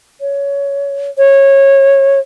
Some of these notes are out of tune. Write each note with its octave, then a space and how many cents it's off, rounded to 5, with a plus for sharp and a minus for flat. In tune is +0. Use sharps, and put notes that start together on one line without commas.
C#5 +15
C#5 -20